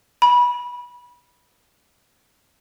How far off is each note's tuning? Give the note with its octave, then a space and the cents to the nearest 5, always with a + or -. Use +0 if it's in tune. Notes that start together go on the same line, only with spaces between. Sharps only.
B5 -20